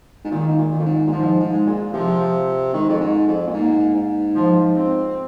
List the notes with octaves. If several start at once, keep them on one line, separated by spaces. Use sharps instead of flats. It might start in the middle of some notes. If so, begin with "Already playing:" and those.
G#2
A#2 D#3
G#2
A#2
D#3
F2
G#2
A#2
G#2 F3
G#2
G#3
A#2
C3 F3
D#3 G#3
F2
G#2
F2
A#2
G#2 A#3
G#2
F3
C4